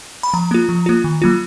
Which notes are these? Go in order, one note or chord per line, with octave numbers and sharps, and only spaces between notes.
B5
F3 A#5
A#3 F4
F3
A#3 F4
D#3
F#3 A#3 F4